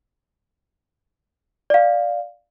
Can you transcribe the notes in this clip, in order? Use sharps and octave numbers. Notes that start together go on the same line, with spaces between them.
D5 F5